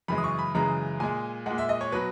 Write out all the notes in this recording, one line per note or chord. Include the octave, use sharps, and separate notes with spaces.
F#2 C#3 E3 G#3 B5
D#6
C#6
B5
F#2 C#3 E3 G#3 A#5
A#2 G#3 G#5
A#2 G#3 F#5
E5
D#5
C#5
B2 F#3 B4